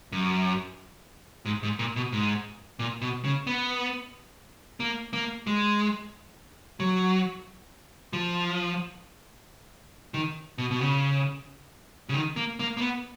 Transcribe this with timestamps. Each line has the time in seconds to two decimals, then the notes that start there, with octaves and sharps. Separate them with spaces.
0.12 F#2
1.45 G#2
1.63 G#2
1.79 A#2
1.96 B2
2.12 G#2
2.79 A#2
3.01 B2
3.24 C#3
3.47 B3
4.80 A#3
5.13 A#3
5.47 G#3
6.80 F#3
8.13 F3
10.14 D#3
10.58 B2
10.71 B2
10.81 C#3
12.09 C#3
12.14 D#3
12.36 A#3
12.59 A#3
12.77 A#3
12.81 B3